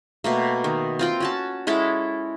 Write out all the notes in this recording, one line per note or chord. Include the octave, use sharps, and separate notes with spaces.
B2 A3 A#3
D#3
C4 F4 G5
C#4 F#4 A5
G#3 C#4 E4 A4